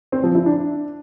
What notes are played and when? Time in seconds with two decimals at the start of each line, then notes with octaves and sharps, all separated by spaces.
0.12 C4
0.24 F3
0.35 E4
0.46 D4